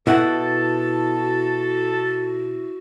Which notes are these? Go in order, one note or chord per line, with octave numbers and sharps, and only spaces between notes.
B2 E4 F#4 A4 F#5 A5